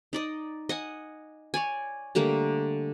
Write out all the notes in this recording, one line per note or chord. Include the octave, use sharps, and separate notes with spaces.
D#4 D5 D#5
D#5 F#5 G#5
C#5 D5 G#5
D3 G3 A3 A#3